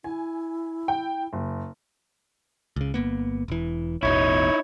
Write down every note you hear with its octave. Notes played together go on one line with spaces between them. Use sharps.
E4 G#5
G5
F#1
C#2 C#3
G1 A#3 B3
E1 E3
A1 E2 B2 D#4 E4 C#5